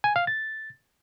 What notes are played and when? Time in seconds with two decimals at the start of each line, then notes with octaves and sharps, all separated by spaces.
0.04 G#5
0.16 F5
0.27 A6